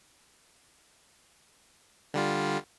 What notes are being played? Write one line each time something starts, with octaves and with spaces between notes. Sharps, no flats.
D3 G3 F4